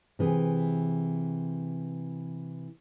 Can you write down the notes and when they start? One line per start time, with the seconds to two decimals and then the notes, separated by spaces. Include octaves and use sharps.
0.19 C3 E3 G#4